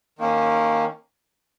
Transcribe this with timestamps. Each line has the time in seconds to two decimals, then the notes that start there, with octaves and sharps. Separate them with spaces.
0.19 D#3 A#3 C#4